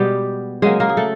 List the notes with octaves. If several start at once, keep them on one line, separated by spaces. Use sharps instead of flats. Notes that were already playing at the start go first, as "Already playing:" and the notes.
Already playing: B2 G3 G#3 B3 G4
C#3 F#3 G#3 A#3 G#4
A#3 A#4
G#4
A3 A4